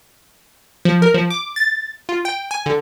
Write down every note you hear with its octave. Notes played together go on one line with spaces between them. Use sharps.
F3
A#4
F3
D6
A6
F4
G5
G#5
D3